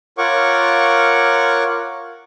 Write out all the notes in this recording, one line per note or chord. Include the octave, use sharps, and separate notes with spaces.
F4 A#4 C#5 F#5 C#6 D6